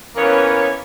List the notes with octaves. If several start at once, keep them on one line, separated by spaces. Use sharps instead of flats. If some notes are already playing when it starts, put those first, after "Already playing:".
E3 A#3 B3 C#4 C#5